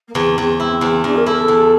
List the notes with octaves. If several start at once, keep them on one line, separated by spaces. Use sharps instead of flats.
A#3
E2 C4
E2
E4
E2
E2 D4
A#4
E4 A4
A4
E2